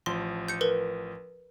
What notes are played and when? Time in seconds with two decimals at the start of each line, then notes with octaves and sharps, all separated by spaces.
0.06 A1 F3 C6
0.48 G6 C#7
0.61 A#4 B4